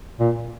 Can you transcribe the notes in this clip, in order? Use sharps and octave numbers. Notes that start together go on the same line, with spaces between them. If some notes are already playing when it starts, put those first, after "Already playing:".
A#2